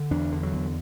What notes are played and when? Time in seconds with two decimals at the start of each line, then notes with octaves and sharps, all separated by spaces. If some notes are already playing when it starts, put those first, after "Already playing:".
Already playing: D3
0.11 E2 D4
0.32 D3
0.43 F#3
0.53 E2